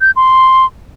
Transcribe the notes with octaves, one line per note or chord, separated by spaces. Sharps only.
G6
C6